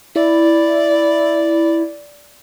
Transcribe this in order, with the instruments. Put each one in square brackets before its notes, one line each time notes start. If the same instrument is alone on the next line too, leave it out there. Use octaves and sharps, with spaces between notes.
[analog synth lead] E4 [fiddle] D5